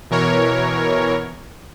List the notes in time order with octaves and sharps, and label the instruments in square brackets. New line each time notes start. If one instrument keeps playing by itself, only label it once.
[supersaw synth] B2 E3 A#4 C#5